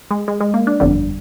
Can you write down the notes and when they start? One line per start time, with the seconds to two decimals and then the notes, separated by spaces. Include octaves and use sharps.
0.11 G#3
0.28 G#3
0.41 G#3
0.54 A#3
0.67 D4
0.80 G1 F2 D3 G3